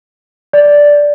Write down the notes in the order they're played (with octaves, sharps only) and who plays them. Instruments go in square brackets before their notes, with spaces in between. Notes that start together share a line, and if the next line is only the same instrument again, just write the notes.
[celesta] D5